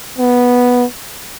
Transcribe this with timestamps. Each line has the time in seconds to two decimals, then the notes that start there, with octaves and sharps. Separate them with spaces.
0.18 B3